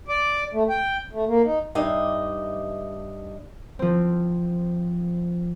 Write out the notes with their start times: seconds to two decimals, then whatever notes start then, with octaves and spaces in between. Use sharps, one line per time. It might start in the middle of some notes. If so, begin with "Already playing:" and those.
0.08 D5
0.54 A3
0.69 G5
1.13 A3
1.28 A#3
1.44 D#4
1.75 G2 D4 D#4 D#5 E5
3.79 F3 C4